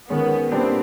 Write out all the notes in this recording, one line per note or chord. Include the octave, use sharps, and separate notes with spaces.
D#3 G#3 B3 C#4
A#2 G3 B3 C4 D4 G4